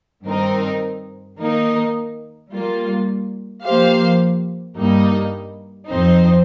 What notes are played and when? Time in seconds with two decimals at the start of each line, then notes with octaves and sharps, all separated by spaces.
0.25 G2 D#3 C4 D#4 A#4
1.38 D#3 A#3 D#4 A#4
2.51 G3 A#3 F4
3.64 F3 A#3 G4 C5 F5
4.76 G2 G3 A#3 D#4
5.89 F2 F3 C4 D#4 C5